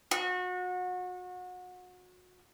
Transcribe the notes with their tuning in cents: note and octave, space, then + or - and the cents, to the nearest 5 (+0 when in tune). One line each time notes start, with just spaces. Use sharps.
F#4 -30